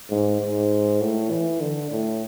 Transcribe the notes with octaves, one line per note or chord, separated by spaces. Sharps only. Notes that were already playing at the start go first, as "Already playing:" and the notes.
G#2
G#2
A2
E3
D3
A2